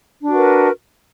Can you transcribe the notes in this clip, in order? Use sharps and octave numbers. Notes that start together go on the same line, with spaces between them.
D4 F#4 A#4 B4